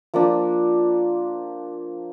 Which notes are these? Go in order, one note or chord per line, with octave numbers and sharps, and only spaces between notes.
F3 A#3 D4